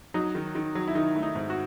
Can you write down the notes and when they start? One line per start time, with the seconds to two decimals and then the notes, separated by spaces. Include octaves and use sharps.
0.14 F#3 D#4
0.35 D#3
0.55 D#3
0.75 F#3
0.88 E4
0.95 D#3 D#4
1.15 A3
1.22 D#4
1.35 G#2
1.50 F#4